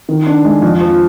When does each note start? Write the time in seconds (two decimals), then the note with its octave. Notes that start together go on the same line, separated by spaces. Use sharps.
0.09 D#3
0.27 D4
0.45 G#3
0.62 F2
0.81 F3